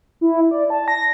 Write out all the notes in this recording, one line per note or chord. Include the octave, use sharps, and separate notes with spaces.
E4
D5
A5
A#6